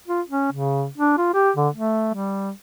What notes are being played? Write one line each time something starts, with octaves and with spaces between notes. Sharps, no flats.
F4
C#4
C#3
D4
F4
G4
D3
A3
G3